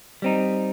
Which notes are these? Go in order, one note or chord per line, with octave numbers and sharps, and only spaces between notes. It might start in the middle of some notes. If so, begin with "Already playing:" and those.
G3 C4 D#4